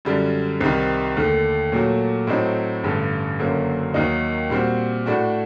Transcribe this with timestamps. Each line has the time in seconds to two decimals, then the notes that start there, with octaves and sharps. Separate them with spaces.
0.05 F#2 D3 G3 D4
0.61 C2 C3 D#3 G3
1.17 D#2 D3 A3
1.72 A#2 F#3 A3
2.27 A2 F#3 C4 D#4
2.84 A1 G2 D3 A3
3.39 F#1 F#2 D3 F#3 A#3
3.94 D#2 D#3 F#3 A#3 D#4
4.50 A#2 G3 C4 F#4
5.06 A2 A3 D4 F#4